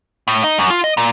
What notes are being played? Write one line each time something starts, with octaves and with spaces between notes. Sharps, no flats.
A2
D#4
F#2
F4
D#5
A#2